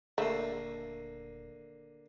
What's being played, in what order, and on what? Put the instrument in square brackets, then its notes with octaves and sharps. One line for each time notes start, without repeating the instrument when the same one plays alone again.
[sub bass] D#1 [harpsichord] D3 A#3 [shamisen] A3 E5